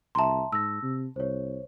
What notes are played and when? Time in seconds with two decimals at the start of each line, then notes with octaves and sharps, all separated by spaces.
0.15 C2 E5 A5 A#5 C6
0.53 G#2 E6 A#6
0.83 C3
1.16 C2 C5 C#5